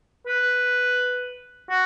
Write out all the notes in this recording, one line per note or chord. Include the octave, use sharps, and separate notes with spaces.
B4
F#4